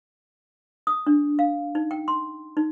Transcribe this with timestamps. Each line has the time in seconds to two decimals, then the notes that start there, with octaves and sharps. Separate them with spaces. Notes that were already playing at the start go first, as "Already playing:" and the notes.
0.87 D#6
1.07 D4
1.39 F5
1.75 D#4
1.91 G5
2.08 C6
2.57 D#4